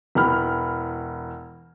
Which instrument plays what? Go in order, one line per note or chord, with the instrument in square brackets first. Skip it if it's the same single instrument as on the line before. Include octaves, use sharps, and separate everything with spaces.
[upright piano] E1 E3 B5 F6